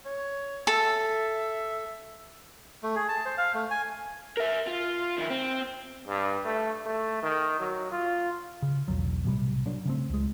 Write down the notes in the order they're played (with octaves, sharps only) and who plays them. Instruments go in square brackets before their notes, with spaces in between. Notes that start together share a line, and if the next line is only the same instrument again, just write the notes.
[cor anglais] C#5
[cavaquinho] A4 [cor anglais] E5
[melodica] A3
G#4
A5
C5
F5
A3
G#5
[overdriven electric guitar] A#4 E5
F4
D#3 E4
C4
[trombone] G2
A3
A3
D#3
F#3
F4
[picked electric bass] C#3
B1 E2 F#3
B1 A2 C3 G3
F#3 A#3 D4
C#3 A3 C4
C#2 G#3